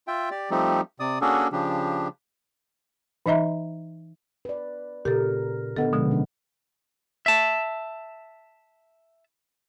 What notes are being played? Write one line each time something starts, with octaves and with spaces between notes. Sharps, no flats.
F4 E5 G5
G4 D5
F3 G3 A3 C4 D#4 G4
C3 D5 D#6
A#3 C#4 D4 F#4 G#4 A4
C#3 F3 D4 G4
E3 D#4 D#5 E5 A#5
B4 D5
A#2 C#3 G4 A4 A#4
D3 B3 A4 B4 D#5 F#5
B2 D3 F3 G#3
C#4 D4
E5 A5